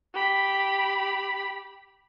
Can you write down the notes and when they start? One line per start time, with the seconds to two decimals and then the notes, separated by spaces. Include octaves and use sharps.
0.14 G4 B5